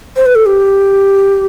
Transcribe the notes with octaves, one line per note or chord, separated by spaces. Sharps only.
C5
B4
A4
G4